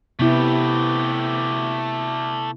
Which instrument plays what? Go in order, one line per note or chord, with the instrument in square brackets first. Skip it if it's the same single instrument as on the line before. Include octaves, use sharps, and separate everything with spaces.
[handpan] C3 B3 E4 [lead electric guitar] A3 G4